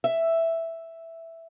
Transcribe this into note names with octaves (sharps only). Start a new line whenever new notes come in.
E5